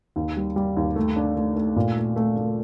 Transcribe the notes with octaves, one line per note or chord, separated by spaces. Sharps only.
D#2
G3
G3
D#2
A3
D4
A3
A3
A#2
A3
A3
A3